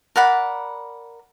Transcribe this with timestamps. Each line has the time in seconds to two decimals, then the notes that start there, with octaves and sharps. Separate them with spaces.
0.16 A#4 D5 F#5 B5